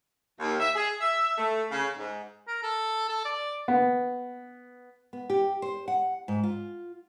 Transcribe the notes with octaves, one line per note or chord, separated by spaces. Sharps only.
D#2
E5
G#4
E5
A3
C#3
G#2
A#4
A4
A4
D5
B3
B3
G4
C5
F#5
G#2
F4